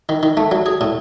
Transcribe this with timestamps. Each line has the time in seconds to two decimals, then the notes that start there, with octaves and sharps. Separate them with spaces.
0.09 D#3
0.23 D#3
0.37 A3
0.51 F#3
0.66 G#4
0.81 A2